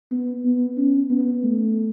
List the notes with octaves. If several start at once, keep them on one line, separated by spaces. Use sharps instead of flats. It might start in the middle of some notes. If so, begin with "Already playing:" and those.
B3
B3
C#4
B3
A3